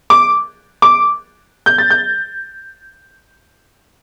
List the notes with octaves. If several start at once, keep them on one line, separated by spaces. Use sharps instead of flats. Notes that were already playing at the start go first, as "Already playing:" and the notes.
D6
D6
G6
A6
G6